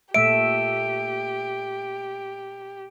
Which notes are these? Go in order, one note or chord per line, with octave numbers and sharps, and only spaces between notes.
A#2 A3 G4 E5 D7